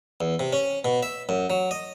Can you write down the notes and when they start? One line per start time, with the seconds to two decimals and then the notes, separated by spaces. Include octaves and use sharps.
0.21 E2
0.39 C3
0.53 C#4
0.85 B2
1.03 E5
1.29 F#2
1.50 F#3
1.71 D#5